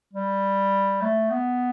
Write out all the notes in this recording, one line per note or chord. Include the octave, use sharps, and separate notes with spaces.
G3
A3
B3